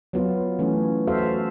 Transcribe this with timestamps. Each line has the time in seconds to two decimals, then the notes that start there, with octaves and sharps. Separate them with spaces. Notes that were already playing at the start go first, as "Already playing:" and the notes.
0.13 F#3 B3 F4
0.59 E3 A3 C#4
1.07 F#4 A4 C5 E5 F5